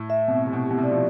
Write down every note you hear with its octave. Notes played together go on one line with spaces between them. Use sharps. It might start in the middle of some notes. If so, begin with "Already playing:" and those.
Already playing: A2
E5
B2 C4
C3 C4
B2
G4
B2
C3
D5
F3